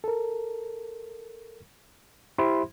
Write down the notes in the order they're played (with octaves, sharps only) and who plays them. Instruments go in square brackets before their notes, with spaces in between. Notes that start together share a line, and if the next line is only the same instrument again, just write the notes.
[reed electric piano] A4 A#4
E4 G4 C5 E5 B5 C6